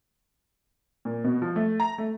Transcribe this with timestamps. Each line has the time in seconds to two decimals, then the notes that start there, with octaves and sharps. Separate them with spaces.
1.05 A#2
1.24 B2
1.42 F3
1.56 A3
1.80 A#5
1.98 A3